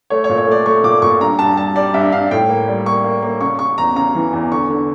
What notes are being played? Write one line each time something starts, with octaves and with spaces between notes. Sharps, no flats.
A3 C#5
C#5
A#2
C#5
A3 D5
A3 C#6
A#2 D6
A#2 C#6
G2 A#5
G2 A5
G3 A5
G3 D5
G2 E5
G2 F5
A2 G5
A#3
G3
A#3 C#6
A#3
A#3
C#3 C#6
C#3 C#6
E2 A#5
C#3 A#5
E3
E2
D3 C#6
D3